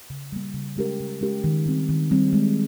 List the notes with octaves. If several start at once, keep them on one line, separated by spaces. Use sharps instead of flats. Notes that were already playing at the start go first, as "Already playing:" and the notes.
C#3
G3 A#3
C#3
G#3 C#4 G4 A#4
C#3
G#3 C#4 G4 A#4
D#3
G3 C4
D#3
G3 C4
G#3